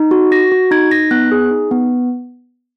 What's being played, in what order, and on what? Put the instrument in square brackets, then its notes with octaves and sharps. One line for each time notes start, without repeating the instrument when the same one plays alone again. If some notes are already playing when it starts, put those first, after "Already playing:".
Already playing: [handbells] D#4
F#4
F#4 A#6
F#4
D#4 G#6
D#4 A#6
B3 F#6
G#4
D#4
B3